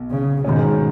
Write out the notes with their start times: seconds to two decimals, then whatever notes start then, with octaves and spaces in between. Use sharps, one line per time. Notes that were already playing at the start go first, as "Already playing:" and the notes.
Already playing: B1
0.11 C#3
0.44 G#2 B2 D#3 G#3 C#4